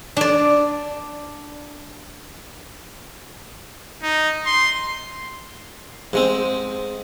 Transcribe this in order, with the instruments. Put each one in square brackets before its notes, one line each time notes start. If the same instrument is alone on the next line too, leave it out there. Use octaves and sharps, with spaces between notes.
[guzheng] D4 D5
[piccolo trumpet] D#4
C6
[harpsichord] G#2 G#3 C4